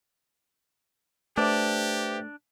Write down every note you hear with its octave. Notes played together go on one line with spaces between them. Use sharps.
A3 D4 G4 B4 C5 E5